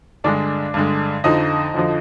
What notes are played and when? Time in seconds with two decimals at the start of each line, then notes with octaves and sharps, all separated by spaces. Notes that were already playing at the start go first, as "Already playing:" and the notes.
0.24 G2 D3 G#3 D4 D5
0.74 G2 D3 G#3
1.24 F2 D3 F3 D#4 D#5
1.74 F2 D3 F3